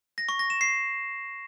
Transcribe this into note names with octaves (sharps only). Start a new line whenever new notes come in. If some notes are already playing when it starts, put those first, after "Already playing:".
A#6
C#6
A#6
E7
C7